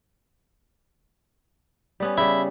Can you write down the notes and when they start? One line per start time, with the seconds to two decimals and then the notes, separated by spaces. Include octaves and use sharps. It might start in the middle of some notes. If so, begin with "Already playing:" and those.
2.00 G3 B3 C#4
2.17 C#3 G3 E4